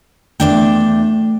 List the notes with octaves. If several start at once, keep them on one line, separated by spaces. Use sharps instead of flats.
E2 A3 D4 G5